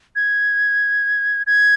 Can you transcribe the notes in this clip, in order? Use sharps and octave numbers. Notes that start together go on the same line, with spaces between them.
G#6
G#6